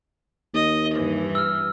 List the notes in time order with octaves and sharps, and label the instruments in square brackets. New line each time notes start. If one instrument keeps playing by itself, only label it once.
[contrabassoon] D#2 [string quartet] D#5
[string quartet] G2 E3
[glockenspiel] E6 F6